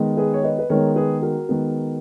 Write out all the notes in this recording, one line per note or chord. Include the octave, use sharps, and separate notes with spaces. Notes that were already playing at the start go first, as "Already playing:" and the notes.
Already playing: D#3 G#3 B3
G#4 B4
C#5
B4 D#5
B4
D#3 G#3 B3 A#4 C#5
G#4 B4
F#4 A#4
D#3 G#3 B3